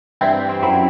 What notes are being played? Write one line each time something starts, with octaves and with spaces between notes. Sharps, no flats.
G2 E3 G3 C4 E4
C4
F#2 F#3 C4 E4